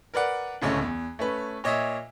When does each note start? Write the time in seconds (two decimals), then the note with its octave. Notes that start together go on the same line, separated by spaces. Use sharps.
0.14 A#4 B4 D5 F#5
0.62 D1 C#2 A3 C#4
0.81 E2
1.19 A3 C#4 B4
1.64 A#2 C#5 D#5 E5